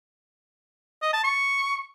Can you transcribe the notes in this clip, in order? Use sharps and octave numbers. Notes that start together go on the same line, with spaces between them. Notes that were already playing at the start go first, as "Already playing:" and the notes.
D#5
A5
C#6